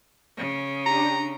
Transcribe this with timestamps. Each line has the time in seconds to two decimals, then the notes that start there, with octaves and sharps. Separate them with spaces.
0.37 C#3
0.86 D4 G4 A#5